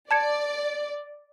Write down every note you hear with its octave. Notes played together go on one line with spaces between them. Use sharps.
D5 A5 G#6 C#7